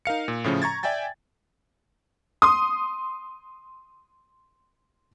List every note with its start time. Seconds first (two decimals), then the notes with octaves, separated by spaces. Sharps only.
0.05 D#4 A#4 F5 C#7
0.28 A#2
0.44 A2 C#3 F3 C#4
0.62 A#5 C#6 G#6 A6
0.83 D5 E5 G5 G#5 A6
2.42 C6 D#6